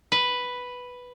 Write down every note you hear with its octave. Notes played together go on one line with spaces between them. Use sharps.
B4